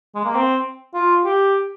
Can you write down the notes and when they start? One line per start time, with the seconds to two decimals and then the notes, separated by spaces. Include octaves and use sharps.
0.15 G#3
0.25 A#3
0.34 C4
0.94 F4
1.25 G4